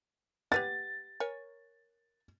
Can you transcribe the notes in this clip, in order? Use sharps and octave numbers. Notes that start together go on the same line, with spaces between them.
G4 B4 F#5 A6
A#4 C#5 G#5